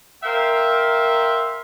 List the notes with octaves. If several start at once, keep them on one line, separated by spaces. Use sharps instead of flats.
A#4 C5 E5 F5 G5